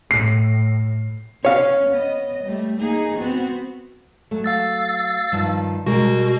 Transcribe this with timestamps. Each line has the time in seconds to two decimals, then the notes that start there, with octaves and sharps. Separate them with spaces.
0.11 A2 C7
1.45 C#4 C#5 F5
1.89 B3 D#5
2.44 G3 A3
2.80 A#3 D#4 G#4
3.17 B3 C4 F#4
4.31 F#3 A3
4.44 F5 E6 A6
5.32 G2 D#3 F3
5.86 B2 G3 G#3 F#4 A#4